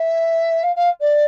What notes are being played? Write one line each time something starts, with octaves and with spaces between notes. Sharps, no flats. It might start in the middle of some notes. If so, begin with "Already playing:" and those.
Already playing: E5
F5
F5
D5